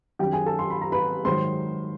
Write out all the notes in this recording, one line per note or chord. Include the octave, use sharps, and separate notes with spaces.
F#2 D#3 F#3 G4 G5
G#4 G#5
A4 A5
C6
B5
A#5
B4 B5
G#2 D#3 F#3 C5 C6